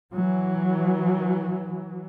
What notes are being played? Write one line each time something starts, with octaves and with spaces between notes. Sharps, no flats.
E3 F#3